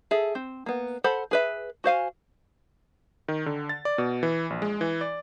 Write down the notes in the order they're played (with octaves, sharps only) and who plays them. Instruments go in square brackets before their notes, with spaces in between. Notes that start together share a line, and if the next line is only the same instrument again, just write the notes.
[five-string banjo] G#4 A4 E5
C4
A#3 B3
A4 C5 F#5 B5
G#4 B4 E5
F#4 C5 F5 G#5
[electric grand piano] D#3
D3
A6
D5
B2
E3
A#1
G#3
E3
D5